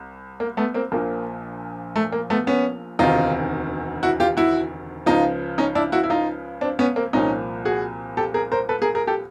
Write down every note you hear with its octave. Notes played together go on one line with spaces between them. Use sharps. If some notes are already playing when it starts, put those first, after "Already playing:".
Already playing: C2
A#3
A3 B3
A#3 C4
A#1 A#2 F3 A#3
A3
A#3
A3 B3
B3 C#4
E1 D2 C3 D#3 D#4 F4
E4 F#4
F4 G4
E4 F#4
C#2 C#3 F3 D#4 F4
C#4 D#4
D4 E4
E4 F#4
E4
D#4 F4
C4 D4
B3 C#4
A#3 C4
C2 A#2 F3 C#4 D#4
F#4 G#4
G4 A4
G#4 A#4
A#4 C5
A4 B4
G#4 A#4
G#4 A#4
G4 A4